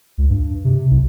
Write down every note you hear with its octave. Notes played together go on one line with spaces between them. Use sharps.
C#2
G2
C3
B1